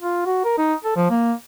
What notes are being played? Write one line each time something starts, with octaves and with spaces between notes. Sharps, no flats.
F4
F#4
A#4
D#4
A4
F3
A#3